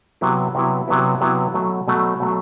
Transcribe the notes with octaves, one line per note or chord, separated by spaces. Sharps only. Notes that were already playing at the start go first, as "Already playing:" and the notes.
C3 F#3 B3 E4
C3 F#3 B3 E4
C3 F#3 B3 E4
C3 F#3 B3 E4
B2 F#3 A3
B2 F#3 A3
B2 F#3 A3